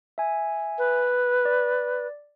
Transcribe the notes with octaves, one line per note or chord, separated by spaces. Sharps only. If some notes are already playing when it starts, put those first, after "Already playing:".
E5 G#5
B4
D5